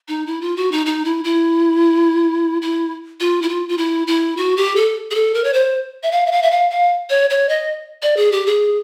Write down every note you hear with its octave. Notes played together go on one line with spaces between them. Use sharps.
D#4
E4
F4
F#4
D#4
D#4
E4
E4
E4
F4
E4
F4
F4
E4
E4
F#4
G4
A4
G#4
A4
A#4
C#5
C5
E5
F5
E5
F5
E5
F5
F5
C#5
C#5
D#5
D5
G#4
G4
G#4